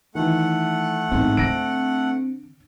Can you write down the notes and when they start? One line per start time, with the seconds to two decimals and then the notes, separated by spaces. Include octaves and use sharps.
0.15 D#3 E3 A3 F#5
1.12 A1 G#2 B3 C4
1.37 D3 D4 A#6 D7